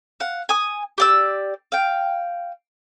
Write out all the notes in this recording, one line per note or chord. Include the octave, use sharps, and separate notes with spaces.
F5 F#5
G#5 D#6
G4 D5 E6
F5 G5